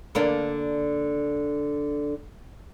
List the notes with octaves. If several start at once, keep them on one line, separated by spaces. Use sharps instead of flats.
D3 A#3 D4